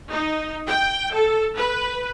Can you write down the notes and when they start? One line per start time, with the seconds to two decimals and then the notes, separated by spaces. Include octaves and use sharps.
0.11 D#4
0.67 G5
1.13 A4
1.57 B4